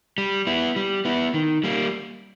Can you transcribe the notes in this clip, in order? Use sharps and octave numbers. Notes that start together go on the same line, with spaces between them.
G3
B3 E4
G3
B3 E4
D#3
G3 A#3